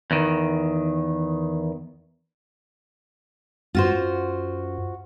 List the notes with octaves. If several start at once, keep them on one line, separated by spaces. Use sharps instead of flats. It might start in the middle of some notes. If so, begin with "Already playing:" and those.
E2 D#3
F#2 F4 F#4 C5